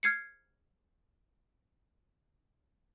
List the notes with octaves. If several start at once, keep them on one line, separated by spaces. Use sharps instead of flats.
F6 G#6 C7 C#7